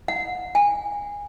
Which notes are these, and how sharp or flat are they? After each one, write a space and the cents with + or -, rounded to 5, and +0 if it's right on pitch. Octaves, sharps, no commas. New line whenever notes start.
F#5 -30
G#5 -20